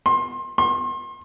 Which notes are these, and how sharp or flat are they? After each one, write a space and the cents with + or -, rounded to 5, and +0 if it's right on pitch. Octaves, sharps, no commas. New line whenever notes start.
C6 +25
C6 +35